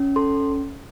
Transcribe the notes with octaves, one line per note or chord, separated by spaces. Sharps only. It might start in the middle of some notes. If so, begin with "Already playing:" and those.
Already playing: C#4
A4 C6